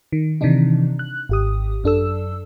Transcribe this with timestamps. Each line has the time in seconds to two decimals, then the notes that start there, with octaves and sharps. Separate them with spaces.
0.12 D#3
0.41 C3 D#3 E3 D4 D#4
0.99 F#6
1.29 G#1 G4 D#6
1.84 F#2 D4 A4 E6